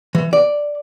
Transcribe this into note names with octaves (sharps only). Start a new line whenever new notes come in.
E3
D5